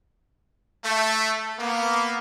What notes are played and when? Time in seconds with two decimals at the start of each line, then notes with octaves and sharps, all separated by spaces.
0.84 A3
1.59 A#3 B3